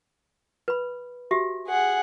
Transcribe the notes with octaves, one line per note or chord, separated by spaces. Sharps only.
B4 B5
F#4 G4 E5
G#4 F#5